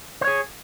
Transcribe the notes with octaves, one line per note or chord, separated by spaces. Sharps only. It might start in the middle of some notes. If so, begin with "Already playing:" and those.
G#4 C5 C#5